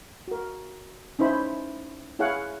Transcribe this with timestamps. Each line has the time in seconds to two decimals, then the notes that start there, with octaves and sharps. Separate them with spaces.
0.28 F#4 A#4
1.19 C#4 D#4 E4 C5 B5
2.19 E4 G#4 C#5 F5 F#5